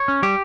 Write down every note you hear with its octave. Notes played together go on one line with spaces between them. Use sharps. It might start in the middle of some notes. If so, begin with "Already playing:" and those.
Already playing: C#5
C#4
G3 G4